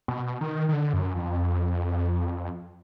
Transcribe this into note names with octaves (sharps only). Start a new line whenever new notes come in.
B2
D#3
D#3
D3
F#2
F2